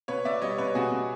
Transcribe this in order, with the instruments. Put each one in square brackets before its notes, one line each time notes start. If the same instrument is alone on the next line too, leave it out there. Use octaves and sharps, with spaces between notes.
[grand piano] B2 B4 C#5
B2 D5 E5
G3 C#5 D#5
B2 B4 C#5
B2 F#4 G#4
B2